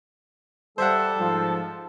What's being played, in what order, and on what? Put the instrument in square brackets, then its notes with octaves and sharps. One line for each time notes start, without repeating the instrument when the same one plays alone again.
[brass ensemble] G3 [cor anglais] A4 [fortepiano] C5 E5 F#5
[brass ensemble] G#2 F3